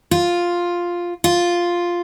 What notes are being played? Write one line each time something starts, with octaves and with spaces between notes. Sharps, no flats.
F4
F4